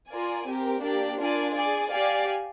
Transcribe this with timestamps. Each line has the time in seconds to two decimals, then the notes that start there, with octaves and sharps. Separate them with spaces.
0.10 F4 A#4 D5 G#5
0.46 C4 G4 A#4
0.82 A#3 D4 G4 D5
1.18 D4 F4 A#4 D5 G#5
1.55 G#4 D5 G#5
1.91 G4 D5 F5 G#5